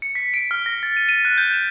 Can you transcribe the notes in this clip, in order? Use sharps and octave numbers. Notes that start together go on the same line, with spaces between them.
C#7
B6
D7
F6
A#6
A6
D#7
D#7
F#6
G6
E7